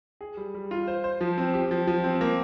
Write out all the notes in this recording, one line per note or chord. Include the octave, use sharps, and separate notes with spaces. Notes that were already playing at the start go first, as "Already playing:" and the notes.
G#4
G3
G3
F4
C5
C5
F3
C4
G4
F3
F3
C4
A#3